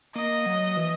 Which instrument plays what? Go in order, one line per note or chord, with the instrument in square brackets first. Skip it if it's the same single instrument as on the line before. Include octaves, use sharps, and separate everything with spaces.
[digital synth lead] A#3 [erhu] D#5
[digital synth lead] F#3
E3